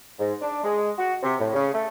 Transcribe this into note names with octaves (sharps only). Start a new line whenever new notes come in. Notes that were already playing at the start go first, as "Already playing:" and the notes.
G#2
D4
G#3
F#4
C3
A2
C#3
A3